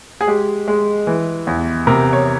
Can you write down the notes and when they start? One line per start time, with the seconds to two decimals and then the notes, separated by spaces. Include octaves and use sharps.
0.21 G#4
0.28 G#3 G4
0.68 G#3
1.07 E3
1.47 E2
1.87 C3 A#4
2.13 C#5